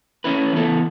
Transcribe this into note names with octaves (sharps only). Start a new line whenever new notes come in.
A3 C#4 E4 B4
E3 B3 E4 A4